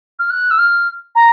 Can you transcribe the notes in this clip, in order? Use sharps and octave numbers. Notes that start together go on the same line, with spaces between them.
F6
F#6
E6
F6
A#5